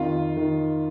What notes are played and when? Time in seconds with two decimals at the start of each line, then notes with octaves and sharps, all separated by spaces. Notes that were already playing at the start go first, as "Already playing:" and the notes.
Already playing: F2 D#3 F4
0.37 D#3